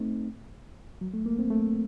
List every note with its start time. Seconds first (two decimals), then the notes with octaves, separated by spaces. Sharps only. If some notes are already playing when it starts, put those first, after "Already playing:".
Already playing: A3 C4 D#4
1.01 F#3
1.13 A3
1.26 A#3
1.38 C4
1.50 A3